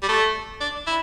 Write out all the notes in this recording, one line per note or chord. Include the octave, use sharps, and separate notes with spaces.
G3
A3
D4
E4